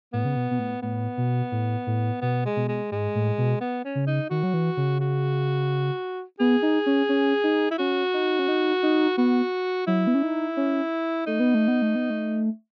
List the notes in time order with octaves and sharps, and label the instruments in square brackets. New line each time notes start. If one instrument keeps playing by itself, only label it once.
[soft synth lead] A2 [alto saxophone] B3
[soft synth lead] C#3
B2
B2
A2
[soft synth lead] A2 [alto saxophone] B3
[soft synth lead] B2
A2
A2
[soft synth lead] B2 [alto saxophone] B3
[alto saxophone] G#3
[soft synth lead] B2
[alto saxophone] G#3
[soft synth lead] G#2 [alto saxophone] G#3
[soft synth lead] A2
B2
[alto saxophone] B3
C#4
[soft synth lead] C#3
[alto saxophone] D#4
[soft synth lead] D#3 [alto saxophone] F#4
[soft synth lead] F#3
E3
C#3
[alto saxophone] F#4
[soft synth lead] B3 [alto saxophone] G#4
[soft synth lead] D#4
C#4
C#4
D#4
[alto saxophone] E4
[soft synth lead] C#4 [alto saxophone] F#4
[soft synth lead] D#4
C#4
D#4
D#4
[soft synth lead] B3 [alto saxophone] F#4
[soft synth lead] F#3 [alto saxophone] E4
[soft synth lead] B3
C#4
D#4
C#4
[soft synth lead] A3 [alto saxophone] D#4
[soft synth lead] B3
A3
B3
A3
B3
A3